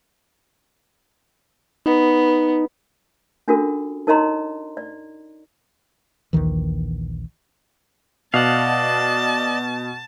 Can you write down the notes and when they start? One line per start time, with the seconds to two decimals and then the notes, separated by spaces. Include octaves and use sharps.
1.86 B3 D#4
3.48 C#4 D4 F4 F#4 A4 A#4
4.07 D#4 A#4 C#5 D#5 A#5 C6
4.77 D5
6.33 A#1 D#2 D#3 E3
8.34 B2 D5 D#5 F5 F#5 A5